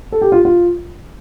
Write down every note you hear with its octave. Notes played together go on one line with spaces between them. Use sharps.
A4
G4
F4
F4